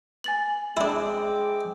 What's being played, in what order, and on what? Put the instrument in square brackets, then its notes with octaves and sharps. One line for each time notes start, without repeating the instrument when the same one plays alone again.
[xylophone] G#5 A6 F#7
[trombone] G#3 [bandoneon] C4 G5 D6 [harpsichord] D4 E4